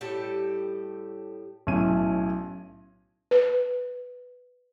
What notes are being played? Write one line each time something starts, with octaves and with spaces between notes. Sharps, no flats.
A2 G3 G4 A4
B1 A2 C#4 D#7
B4